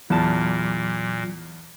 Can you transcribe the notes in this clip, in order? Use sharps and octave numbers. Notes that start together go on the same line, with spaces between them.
E2 A#2 F#3 A5